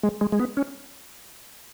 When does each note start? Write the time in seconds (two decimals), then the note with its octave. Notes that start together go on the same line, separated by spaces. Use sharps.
0.03 G#3
0.21 G#3
0.32 G#3
0.40 B3
0.57 C#4